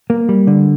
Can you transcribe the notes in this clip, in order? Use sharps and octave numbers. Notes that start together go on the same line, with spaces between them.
A#3
G3
D3